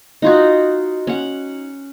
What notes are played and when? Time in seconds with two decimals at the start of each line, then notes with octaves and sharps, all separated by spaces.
0.22 D#4 F4 F#4
1.07 C#4 F#5